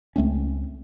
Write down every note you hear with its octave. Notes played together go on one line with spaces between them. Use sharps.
C#2 A3 C4 C#4